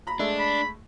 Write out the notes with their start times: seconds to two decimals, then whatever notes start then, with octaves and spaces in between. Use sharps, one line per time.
0.07 A#5 B5
0.19 G#3 A3 D4 E5
0.39 B5